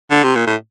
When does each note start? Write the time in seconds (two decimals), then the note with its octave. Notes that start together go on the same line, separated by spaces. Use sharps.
0.11 D3
0.23 C3
0.35 A#2
0.47 A2